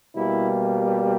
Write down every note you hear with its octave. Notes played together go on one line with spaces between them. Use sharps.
B2 G3 A#3 E4